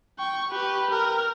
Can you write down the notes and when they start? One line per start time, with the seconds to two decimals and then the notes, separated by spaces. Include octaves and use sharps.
0.19 G5 C#6
0.49 G4 B4
0.91 A#4